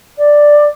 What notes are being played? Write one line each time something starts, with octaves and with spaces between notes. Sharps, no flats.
D5